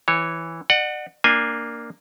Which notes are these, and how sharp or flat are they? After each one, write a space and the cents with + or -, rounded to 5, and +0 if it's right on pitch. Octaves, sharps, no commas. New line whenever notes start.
E3 +0 C#5 -10
D5 +45 F#5 +0
A#3 +0 D4 +10 G#5 -15